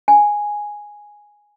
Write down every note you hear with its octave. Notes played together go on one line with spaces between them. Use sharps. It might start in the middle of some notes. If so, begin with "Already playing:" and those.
G#5